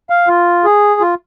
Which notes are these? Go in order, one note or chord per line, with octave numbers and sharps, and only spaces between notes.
F5
F4
G#4
F4